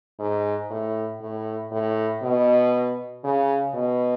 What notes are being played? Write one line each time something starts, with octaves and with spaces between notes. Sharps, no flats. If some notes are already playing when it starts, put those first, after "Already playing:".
G#2
A2
A2
A2
B2
C#3
B2